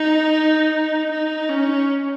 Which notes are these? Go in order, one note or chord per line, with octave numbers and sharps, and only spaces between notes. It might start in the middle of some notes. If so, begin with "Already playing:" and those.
Already playing: D#4
D#4
C#4